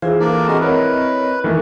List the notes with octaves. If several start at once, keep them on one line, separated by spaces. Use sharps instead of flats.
E3 E4 F4 G#4 C5 F5
A#3 D4 A4 D5
G#3 C4 F#4 A#4 D#5
E4 A#4 B4 C#5
D#3 E3 A3